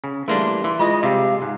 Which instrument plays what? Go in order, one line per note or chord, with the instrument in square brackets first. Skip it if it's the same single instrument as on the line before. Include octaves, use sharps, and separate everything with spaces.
[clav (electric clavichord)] C#3 [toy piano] G#5
[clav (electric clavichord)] E3 A#3 D4 [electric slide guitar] G3 A3 [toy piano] G#4 [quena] C6
[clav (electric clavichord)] E3
[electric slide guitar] G#3 [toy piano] F4 C#6 D#6 [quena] D#5
[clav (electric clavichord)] C3 G3 [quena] F5
[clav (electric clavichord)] G#2